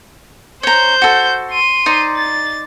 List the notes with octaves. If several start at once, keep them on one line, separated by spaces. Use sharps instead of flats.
C5 C#5 A#5 G6
F#4 A4
C6 D#7
D#4 C5 D5
A6